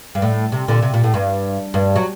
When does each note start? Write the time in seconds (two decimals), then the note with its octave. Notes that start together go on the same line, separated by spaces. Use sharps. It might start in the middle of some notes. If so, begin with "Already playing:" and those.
0.15 G2
0.22 A2
0.52 C3
0.68 A#2 D3
0.82 C3
0.94 A#2
1.04 A2
1.14 G2
1.74 G2
1.96 F#3